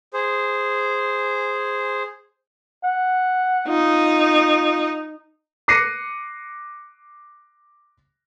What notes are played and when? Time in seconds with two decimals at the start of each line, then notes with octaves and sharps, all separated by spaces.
0.14 G#4 C5
2.83 F#5
3.68 D#4 F4
5.68 D6 F#6 A#6 C7 C#7 D#7